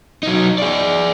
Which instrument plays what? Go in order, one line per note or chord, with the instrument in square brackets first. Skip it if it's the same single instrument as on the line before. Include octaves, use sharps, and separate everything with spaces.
[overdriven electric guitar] F#3 D#4
G#4 D5